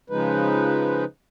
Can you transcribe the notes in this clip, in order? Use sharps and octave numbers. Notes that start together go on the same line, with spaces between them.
C#3 F3 G#3 D#4 B4